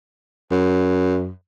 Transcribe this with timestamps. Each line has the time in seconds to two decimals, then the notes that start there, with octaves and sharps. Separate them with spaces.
0.51 F#2